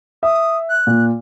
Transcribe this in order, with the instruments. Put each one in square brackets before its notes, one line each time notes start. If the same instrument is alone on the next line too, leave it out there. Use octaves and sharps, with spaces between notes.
[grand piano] E5 [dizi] D#6
[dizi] F#6
[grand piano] A#2